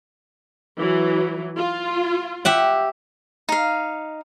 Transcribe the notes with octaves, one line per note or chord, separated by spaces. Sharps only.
E3 F#3
F4
G4 E5 F#5
D#4 F5